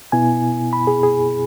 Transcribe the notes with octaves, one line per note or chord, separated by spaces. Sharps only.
B2 B3 E4 G#5
B5
G#4
G#4